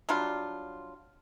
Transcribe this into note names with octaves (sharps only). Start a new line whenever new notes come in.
F#3 G3 D4 F4